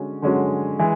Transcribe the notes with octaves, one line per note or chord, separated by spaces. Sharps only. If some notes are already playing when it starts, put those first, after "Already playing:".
Already playing: D3 G#3 C#4 F#4
D3 G#3 C#4 F#4
E3 G#3